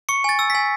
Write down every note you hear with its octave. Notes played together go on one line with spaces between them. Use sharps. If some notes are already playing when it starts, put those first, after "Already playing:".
C#6 C#7
G#5 A6
E6
G#5 B6